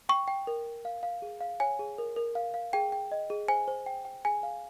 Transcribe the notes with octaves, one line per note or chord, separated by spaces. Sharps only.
G5 C#6
G5
A#4
A#4
F5
F5
G#4
F5
C#5 G#5
G#4
A#4
A#4
F5
F5
G#4 G5
G5
D#5
G#4
C5 G#5
C5
G5
G5
G#4 G#5
F5